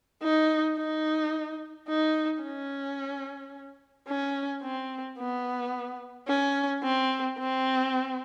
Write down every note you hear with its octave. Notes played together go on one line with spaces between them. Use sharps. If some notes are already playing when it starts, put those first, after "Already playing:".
D#4
D#4
D#4
C#4
C#4
C4
B3
C#4
C4
C4